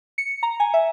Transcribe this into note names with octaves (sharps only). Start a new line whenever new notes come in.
C#7
A#5
G#5
E5